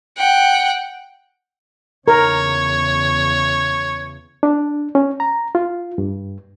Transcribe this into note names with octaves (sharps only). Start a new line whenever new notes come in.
F#5 G5
E2 C#3 A#4 C#5
D4
C#4
A#5
F4
G2